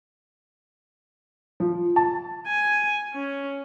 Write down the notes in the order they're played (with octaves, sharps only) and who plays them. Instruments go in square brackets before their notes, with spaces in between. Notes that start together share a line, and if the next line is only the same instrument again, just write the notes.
[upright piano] F3
A5
[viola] G#5
C#4